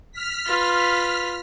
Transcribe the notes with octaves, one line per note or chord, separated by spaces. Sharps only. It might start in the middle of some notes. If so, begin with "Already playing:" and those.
F6 B6
F4 B4